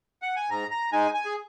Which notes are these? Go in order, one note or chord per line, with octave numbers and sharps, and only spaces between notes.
F#5
G#5
G#2 A#5
A#5
G#3 D#4 G#5
G#5
G#4